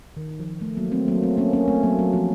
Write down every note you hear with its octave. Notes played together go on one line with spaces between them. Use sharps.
D#3
F3
A3
F#3 A#3
A3 C4
F#3 A#3
A3 C4
A#3 C#4
A#3 C#4
A3 C4
F#3 A#3
F#3
F3